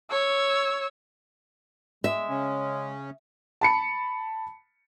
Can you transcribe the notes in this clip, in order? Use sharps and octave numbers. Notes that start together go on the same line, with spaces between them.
C#5 E6
G#3 E5
C#3 C#4
A5 B5 C#7